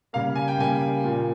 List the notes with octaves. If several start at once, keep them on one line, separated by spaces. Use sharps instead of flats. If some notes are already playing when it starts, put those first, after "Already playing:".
C#3 G3 A#3 F5
G#5
G5
C#3 G3 A#3 G#5
A#2 F3 A#3